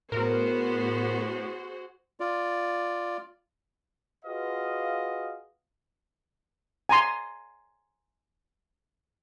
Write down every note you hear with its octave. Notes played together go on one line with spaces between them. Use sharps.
A2 B3 F#4 G#4 A#4 C5
F4 D5
F4 F#4 G#4 B4 D#5 F5
G#5 A#5 C6